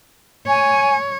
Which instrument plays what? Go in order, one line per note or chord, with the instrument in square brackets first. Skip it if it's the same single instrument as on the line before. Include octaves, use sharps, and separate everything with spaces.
[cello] C#5 [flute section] G#5